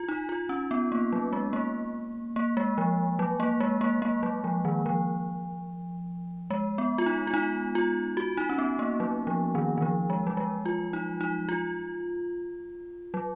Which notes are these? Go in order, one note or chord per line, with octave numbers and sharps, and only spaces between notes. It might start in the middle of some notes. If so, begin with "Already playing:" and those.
Already playing: F4
D#4
F4
C#4
B3
A#3
F#3
G#3
A#3
A#3
G#3
F3
F#3
A#3
G#3
A#3
A#3
F#3
F3
D#3
F3
G#3
B3
F4
D#4
F4
D#4
F4
F#4
D#4
C#4
B3
A#3
F#3
F3
D#3
D#3
F3
G#3
F#3
G#3
F4
D#4
D#4
F4
F#3